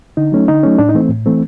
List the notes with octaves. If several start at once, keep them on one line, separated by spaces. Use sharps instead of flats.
D3 D#4
F#3 A3 C#4
D3 D#4
F#3 A3 C#4
A2 D4
D#4
E3 A3 C4
A2
E3 A3 C4